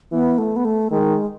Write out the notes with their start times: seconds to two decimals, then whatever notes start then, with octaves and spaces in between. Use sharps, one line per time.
0.12 E3 B3
0.38 A3
0.56 B3
0.65 A3
0.91 D#3 G#3